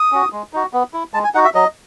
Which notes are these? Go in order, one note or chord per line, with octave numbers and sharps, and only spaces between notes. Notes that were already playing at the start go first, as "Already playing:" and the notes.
Already playing: D#6
C#4 F#4
G#3
D#4 F#4
B3
E4
G#3 A5
G#5
D#4 F#4 F#5
E5
F#3 D#5